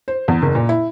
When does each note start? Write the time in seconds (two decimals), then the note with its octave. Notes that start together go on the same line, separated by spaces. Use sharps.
0.08 C5
0.28 E2
0.42 F#1
0.55 A#2
0.69 E4